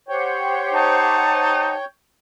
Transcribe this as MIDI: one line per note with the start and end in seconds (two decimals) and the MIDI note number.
0.09 1.74 67
0.09 1.74 72
0.09 1.85 73
0.09 1.74 78
0.09 1.85 79
0.73 1.74 63
0.73 1.75 81